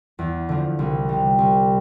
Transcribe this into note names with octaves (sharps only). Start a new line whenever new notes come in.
E2
D3 F3
C2
C3 G3
C2